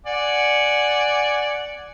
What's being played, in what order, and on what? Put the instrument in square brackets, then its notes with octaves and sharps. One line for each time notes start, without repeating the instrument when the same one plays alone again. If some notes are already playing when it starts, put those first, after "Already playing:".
[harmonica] D5 F#5 G#5